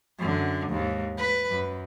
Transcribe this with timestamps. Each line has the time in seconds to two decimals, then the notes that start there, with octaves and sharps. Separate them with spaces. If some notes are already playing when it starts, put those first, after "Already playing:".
0.19 F#2 D3
0.70 D#2 G#2
1.17 B4
1.50 F#2